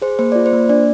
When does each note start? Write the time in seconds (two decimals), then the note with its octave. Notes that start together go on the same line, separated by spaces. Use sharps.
0.02 G#4 C5
0.19 A#3 C5
0.32 F4 D5
0.46 C5
0.53 A#3
0.69 D4 D5